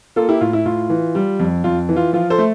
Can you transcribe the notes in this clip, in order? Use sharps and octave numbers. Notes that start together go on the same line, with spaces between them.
A#3 F4 A4
E4 G4
A2 F4
E4
A2 F4
E3
G3
F2
F2 F4
E3
F4
F3 F4
A4 C5
A3